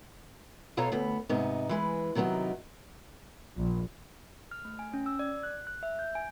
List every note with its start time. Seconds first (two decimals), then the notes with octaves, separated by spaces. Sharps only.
0.77 B2 F4 A4 C#5 F5 A#5
0.92 D2 B3
1.29 G#2 C3 B3 D#4
1.69 E3 G#3 B4
2.15 C3 D#3 F#3 B3 D#4
3.57 A#1
4.51 F6
4.65 A3
4.79 G#5
4.94 C#4
5.06 E6
5.19 D5
5.43 F#6
5.67 F#6
5.83 E5
5.99 G6
6.15 G#5